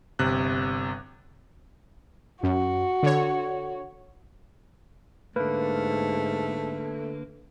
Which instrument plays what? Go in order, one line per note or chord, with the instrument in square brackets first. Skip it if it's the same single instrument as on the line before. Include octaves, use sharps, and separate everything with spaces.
[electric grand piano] G1 C3 F#6
[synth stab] F#2 [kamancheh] F#4
[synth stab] D3 C#5
[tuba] G#2 [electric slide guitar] D3 A#3 [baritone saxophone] A3 [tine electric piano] B4